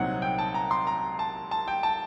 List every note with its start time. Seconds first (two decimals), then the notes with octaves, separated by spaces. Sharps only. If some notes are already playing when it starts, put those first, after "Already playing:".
Already playing: C2 A#2 F#3 C4 D#4 F#5
0.22 G5
0.38 A5
0.54 A#5
0.71 C6
0.87 A#5
1.19 A5
1.51 A5
1.68 G5
1.83 A5